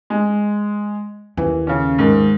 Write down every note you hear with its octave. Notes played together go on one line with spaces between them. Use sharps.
G#3
D#2 E3
C#3 C#4
G#2 D#3